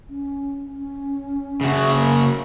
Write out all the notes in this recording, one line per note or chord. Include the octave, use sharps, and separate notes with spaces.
C#4
C#4
C#3 F#4 E5
A#3